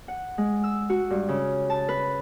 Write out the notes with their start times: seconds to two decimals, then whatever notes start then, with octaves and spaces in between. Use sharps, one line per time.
0.08 F#5
0.38 G#3
0.64 E6
0.90 F#4
1.10 G2
1.29 C#3
1.70 A5
1.89 B4